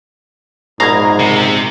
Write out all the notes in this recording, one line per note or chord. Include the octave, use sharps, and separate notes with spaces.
A#1 G#2 B2 F5 A#5 G#6
C3